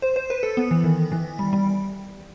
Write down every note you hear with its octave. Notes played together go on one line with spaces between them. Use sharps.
C5
C5
B4
A4
B3
E3
D#3
E3
G3
G3